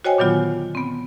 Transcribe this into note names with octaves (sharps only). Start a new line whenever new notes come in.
F#4 C5 C#5 D#5 G5 G#5
A#2 D3 D#3 F#3 B3 F4
B3 C4